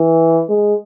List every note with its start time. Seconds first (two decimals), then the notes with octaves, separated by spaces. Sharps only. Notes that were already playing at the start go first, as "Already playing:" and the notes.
Already playing: E3
0.50 G#3